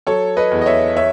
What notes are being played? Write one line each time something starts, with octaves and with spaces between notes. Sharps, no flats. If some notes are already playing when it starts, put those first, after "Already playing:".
F#3 A4 C#5
B4 D#5
E2
D#5
C#5 E5
C#5 E5